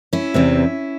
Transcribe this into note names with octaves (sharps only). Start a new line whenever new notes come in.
C#4 E4
E2 C3 E3 C4